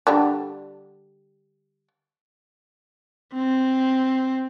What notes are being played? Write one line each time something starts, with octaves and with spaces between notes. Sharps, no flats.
D3 G3 D4
C4